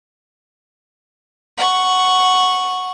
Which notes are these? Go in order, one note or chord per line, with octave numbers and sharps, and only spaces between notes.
F#5 C#6